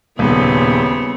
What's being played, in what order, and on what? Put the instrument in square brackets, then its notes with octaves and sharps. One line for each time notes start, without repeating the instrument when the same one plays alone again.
[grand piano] D#1 [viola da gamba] C#3 B3 C4